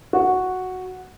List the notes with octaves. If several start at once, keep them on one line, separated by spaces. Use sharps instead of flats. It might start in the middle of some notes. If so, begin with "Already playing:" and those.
F#4